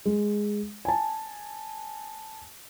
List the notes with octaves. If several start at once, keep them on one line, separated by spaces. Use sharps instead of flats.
G#3
G#5 A5